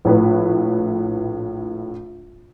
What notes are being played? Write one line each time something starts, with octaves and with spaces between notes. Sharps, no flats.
A#1 A2 B4